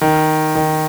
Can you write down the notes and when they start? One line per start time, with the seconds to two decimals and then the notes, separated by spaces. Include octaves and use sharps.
0.01 D#3
0.55 D#3